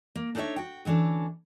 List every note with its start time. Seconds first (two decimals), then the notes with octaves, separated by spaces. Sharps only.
0.16 A#3
0.35 D4 D#4 A4 B4 C#5 E5
0.56 F#4 G5
0.85 D2 E3 C#4 D4 A4